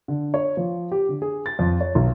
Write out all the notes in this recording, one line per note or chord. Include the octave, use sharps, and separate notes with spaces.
D3
C#5
F3
G4
D3
G#4
A6
F2
C#5
B1